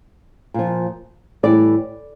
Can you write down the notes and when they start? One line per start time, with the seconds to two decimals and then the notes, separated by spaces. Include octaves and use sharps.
0.54 A#2 F3
1.43 A2 E3 G3 D5